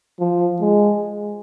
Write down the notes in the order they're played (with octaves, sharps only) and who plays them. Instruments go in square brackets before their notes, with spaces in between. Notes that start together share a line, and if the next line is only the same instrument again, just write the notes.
[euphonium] F3
G#3